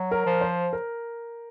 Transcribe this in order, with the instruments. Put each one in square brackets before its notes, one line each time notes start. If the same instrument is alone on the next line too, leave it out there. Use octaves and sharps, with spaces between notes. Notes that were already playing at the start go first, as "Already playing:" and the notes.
Already playing: [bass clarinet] F#3
[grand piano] A#4
[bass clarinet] F3
[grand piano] C5
A#4